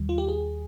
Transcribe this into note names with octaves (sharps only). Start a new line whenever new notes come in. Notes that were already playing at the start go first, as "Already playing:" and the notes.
Already playing: D#2 D#3 G3
F4
G4
G#4